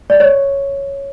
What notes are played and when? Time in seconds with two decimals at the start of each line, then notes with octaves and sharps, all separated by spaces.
0.10 D5
0.20 C#5